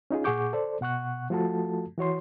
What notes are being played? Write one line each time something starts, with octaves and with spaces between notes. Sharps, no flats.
C#4 D#4 F4 G#4
A#2 G#4 F#5 C#6 D6 G6
A4 C5 D5
B2 F#5 C#6 F#6
F3 A3 F4 F#4 A4 A5
E3 F#4 C#5 C6